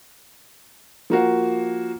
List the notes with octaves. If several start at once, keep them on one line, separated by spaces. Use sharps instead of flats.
F3 A#3 F#4